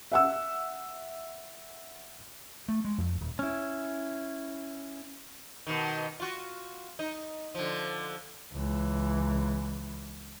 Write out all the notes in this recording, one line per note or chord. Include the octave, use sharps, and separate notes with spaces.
E5 F#5 E6
A3
G#3
F2
D#1
C#4 E4
B2 D#3
F4 F#4
D#4
D3 F3
C#2 E3